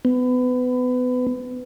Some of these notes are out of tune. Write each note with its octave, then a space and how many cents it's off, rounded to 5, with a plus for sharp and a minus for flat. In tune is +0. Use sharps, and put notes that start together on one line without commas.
B3 +25